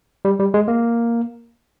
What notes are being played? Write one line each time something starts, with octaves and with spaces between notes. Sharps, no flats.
G3
G3
G#3
A#3